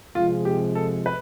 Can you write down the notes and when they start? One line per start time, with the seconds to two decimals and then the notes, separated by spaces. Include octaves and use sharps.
0.15 C3 F3 G#3 F4
0.45 G4
0.75 A4
1.06 B4